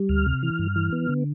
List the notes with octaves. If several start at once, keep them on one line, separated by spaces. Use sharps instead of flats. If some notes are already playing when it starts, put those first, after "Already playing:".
Already playing: G3
D2 F6
C3
E3
G2
E3
B3
D3